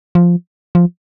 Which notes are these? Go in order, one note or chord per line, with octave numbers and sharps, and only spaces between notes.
F3
F3